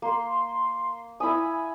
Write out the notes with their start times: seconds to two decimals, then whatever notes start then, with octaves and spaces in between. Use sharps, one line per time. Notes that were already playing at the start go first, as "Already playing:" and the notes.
0.02 A#3 C6
1.20 E4 G#5 B5 D#6